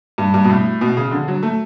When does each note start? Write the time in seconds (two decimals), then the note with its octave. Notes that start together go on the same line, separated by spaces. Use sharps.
0.18 G2
0.34 G2
0.45 B2
0.49 A2
0.81 B2
0.97 C#3
1.11 D3
1.28 F#3
1.43 A3